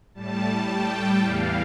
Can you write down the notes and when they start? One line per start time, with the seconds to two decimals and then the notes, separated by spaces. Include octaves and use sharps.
0.15 A2 G3 A5
0.69 G5
1.22 E2 E3 G3 F5